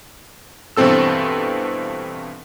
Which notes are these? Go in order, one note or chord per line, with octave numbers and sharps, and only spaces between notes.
G2 B2 E3 C4 A4 E6